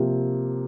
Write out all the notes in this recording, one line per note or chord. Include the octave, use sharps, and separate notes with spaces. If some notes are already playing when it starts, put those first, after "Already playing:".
Already playing: C3 F3 A#3